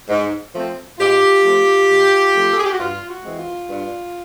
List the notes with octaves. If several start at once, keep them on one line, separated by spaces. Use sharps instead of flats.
G#2
F3 A3 C4
G#2 F4 G4
F3 A3 C4
G#2
F3 A3 C4
A4
G#4
G4
F#4
G2 F4
F#4
E3 G#3 C4
F4
G2